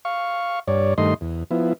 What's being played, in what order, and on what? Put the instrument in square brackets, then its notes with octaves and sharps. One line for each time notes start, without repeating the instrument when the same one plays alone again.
[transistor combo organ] F5 C#6
G2 C#5 D5
G2 D#3 A3 D#5 C6
E2
F3 B3 E4